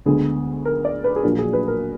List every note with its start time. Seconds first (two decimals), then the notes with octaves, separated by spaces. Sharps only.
0.06 D2 D3 G#3 B3 G#4
0.65 A#4
0.85 D5
1.04 B4
1.16 G#4
1.23 A#1 A#2 F#3 D4 A#4
1.39 G#4
1.53 B4
1.68 A#4